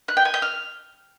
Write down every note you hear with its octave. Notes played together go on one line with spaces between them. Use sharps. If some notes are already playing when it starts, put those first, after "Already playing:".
F#6
G5
G#5
G6
F6